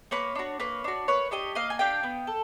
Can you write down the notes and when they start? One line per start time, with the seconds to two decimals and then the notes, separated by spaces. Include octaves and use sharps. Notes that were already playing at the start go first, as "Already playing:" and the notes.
0.11 A#3 B4 C#5
0.35 D4 F#4
0.60 A#3 B4 C#5
0.84 D4 F#4
1.08 A#3 B4 C#5
1.31 D4 G4 C#5 D#5
1.55 A#3 D#5 F5
1.70 G#5
1.79 D4 G4 F5 G5
2.03 B3
2.27 A4